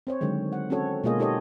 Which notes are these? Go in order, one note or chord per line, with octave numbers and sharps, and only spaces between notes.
C4 C5 C#5
D3 D#3 F#3 G#3
F#5
C4 C#4 F#4 A4 C#5
B2 G#3 A#3 F4 G#4 D#5
D#4 G4 A4 C#5 D#5